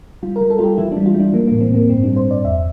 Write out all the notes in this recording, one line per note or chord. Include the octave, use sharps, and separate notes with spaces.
G3 F4
A#4
G3
A4
G3 F4 G4
E3 E4
G3 D4
F4
G3 D4
E3 A#3
A2 A#3
C4
A2 A#3
G2 C4
G3 D4
C5
G2
D5
E2 E5